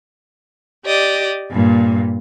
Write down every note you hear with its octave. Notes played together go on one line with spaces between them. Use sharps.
G4 D5 D#5
G2 A#2